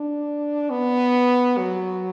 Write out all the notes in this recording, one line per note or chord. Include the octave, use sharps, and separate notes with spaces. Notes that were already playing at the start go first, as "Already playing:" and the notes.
Already playing: D4
B3
F#3